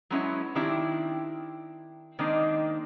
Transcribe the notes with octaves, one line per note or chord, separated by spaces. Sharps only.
F#3 G#3 B3 C#4 D4 E4
D#3 C4 D4 E4 G4
D#3 G#3 A#3 C4 D4 D#4